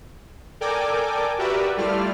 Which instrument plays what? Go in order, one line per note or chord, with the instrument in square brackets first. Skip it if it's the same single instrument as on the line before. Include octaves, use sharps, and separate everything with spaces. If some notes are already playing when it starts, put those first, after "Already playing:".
[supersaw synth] A4 A#4 D5 G5 G#5 D6
F#4 G4 A#4 B4 D5 E5
G3 A3 E4 F4 D5 F6